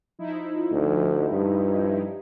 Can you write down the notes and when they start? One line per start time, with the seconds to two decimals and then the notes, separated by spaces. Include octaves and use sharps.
0.19 F3 D#4 E4
0.72 D2
1.30 G2